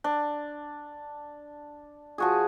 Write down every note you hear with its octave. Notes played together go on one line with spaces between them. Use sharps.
D4
F3 F#4 G#4